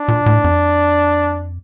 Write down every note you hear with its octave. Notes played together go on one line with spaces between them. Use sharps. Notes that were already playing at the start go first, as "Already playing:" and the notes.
Already playing: D4
A#2
A2
F2